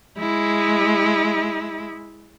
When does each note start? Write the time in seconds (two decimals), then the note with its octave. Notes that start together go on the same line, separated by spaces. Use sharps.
0.19 G#3 E4